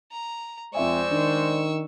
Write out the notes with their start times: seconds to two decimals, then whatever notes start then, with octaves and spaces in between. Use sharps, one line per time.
0.12 A#5
0.75 F2 G#3 C5 D5 E5 G#5 C#6 E6
1.11 D#3 D4